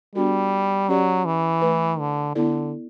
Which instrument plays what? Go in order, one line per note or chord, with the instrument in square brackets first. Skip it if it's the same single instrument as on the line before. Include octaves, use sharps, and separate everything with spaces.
[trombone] G3 [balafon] B3 D4 F#4 A4
[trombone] F#3 [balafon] C#4 G4 D5
[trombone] E3
[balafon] A3 E4 B4
[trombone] D3
[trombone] D3 [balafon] B3 E4 A4 D5